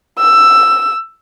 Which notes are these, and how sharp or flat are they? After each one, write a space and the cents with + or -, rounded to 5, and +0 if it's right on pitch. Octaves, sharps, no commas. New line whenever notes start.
E6 +10